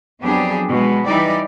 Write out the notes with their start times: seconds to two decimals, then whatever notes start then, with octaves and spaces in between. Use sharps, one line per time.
0.22 F2 F#3 B3 D4 G4 G#4
0.69 B2 G#3
1.05 E3 G3 D#4 G4 D5